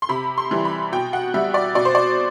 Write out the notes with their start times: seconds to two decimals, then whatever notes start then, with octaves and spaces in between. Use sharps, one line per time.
0.02 C6
0.09 C3 B5
0.38 C6
0.51 E3 G3
0.65 B5
0.92 B2 G5
1.13 F#5
1.34 G3 E5
1.54 D5
1.75 B2 D5
1.85 C5
1.95 D5